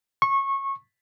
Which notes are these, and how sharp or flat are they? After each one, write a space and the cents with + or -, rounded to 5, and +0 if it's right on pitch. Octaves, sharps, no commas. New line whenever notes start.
C#6 -20